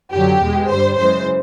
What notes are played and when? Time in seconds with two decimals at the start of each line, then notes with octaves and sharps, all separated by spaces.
0.13 F#2 D3 F#3 G4
0.42 E2 B2 G#3
0.70 G2 D3 G3 C5
0.98 F#2 C#3 E3 G#3 C5